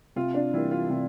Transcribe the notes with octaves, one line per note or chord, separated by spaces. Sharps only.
C3 F4
D4
E3 G3 A#3 E4
F4
C3 F4